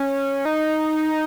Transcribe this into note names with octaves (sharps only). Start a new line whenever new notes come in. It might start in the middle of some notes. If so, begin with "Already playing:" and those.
Already playing: C#4
D#4